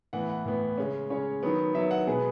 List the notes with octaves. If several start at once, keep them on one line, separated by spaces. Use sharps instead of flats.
A2 E3 B3 F#5
F#5
A2 E3 B3
C#3 G#3 C#4
C#3 G#3 C#4 C#5
D#3 F#3 B3
D#3 F#3 B3 E5
F#5
B2 G#3 B3 G#4